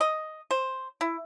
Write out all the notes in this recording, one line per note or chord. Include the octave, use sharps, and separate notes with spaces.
D#5
C5
E4